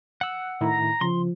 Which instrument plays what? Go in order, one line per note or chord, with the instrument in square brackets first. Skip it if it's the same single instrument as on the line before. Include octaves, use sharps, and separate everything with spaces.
[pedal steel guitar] F#5 E6 [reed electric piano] F#6
[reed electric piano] A2 D#3 E4 [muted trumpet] A#5
[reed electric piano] C#3 [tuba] F3 [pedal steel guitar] C6